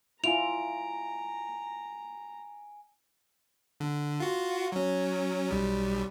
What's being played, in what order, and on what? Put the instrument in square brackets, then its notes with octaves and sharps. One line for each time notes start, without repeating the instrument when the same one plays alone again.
[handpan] E4 F4 [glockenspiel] G#5 D7 [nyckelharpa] A#5 [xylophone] F7
[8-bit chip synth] D3
F4 F#4
F#3 C#4
B1 G3